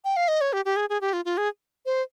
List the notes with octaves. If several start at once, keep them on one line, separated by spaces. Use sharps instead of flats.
G5
F5
D#5
C#5
G4
G4
G#4
G#4
G4
F4
F4
G#4
C5